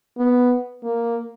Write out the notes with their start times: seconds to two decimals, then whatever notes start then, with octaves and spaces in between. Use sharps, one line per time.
0.18 B3
0.83 A#3